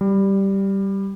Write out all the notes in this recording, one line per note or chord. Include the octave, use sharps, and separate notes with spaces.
G3